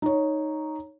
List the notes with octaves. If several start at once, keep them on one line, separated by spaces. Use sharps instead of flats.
D#4 C#5